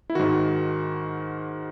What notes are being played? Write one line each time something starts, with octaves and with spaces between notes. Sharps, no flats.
E4
G#2 D#3 F#4